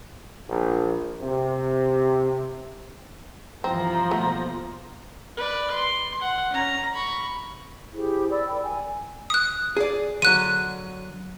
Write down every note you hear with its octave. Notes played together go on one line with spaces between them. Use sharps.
A#1
C3
C2 G2 E3 F3 C4 A#5
D#2 B2 A3 B3
B4 D5
C6
F#5
C#4 A#5
B5 C#6
E4 G4 G#4 C5
D5 B5 E6
A#4 G5 B5
G5 G#5
D#6 F#6
G#4 D5
D3 F#3 F#6 D#7